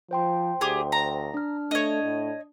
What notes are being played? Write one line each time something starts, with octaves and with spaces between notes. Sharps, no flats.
F3 C5 G5 C6
D2 G4 G#4
A#5
D4 F6
A3 D4 C#5 D#5
A2